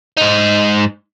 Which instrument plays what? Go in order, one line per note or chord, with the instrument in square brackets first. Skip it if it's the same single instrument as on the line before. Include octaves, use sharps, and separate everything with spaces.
[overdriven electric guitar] G#2 D#4